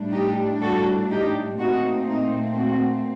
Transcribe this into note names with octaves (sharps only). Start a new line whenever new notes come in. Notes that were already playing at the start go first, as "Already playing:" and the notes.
Already playing: A2 G3 D4
D#4 G4
F#4 A4
D#4 G4
A#2 A3 C4 D#4 F#4
D#4
F#4